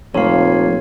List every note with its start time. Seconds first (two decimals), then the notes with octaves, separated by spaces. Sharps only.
0.14 F1 F2 A#2 C#5 F5